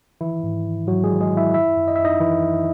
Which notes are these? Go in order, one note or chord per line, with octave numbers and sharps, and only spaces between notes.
D#3 E3 E4
G#2
D#3
G#2 F#3 F#4
G#3 G#4
D#3
G#3 G#4
D#3
E4 E5
F#2 E4 E5
F#2
D#5
F#2 E5
D#4 D#5
D#3 E3 E4
F#2